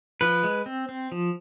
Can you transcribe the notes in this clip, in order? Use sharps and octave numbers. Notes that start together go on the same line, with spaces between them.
F3 B4
G#3
C4
C4
F3